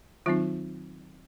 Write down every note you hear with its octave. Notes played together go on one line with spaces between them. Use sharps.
D#3 F#3 C4 D#4 F4